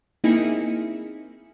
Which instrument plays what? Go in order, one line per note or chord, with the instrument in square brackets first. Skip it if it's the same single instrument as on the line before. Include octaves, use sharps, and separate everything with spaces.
[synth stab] A#3 C4 D#4 E4 G#4 C#7